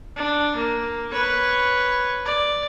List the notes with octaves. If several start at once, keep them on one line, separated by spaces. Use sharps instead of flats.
D4
A#3
B4 C#5
D5